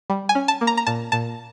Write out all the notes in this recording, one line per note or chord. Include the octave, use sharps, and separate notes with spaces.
G3
G#5
C#4
A5
A#3
A#5
A#5
A#2 A5
A#2 A5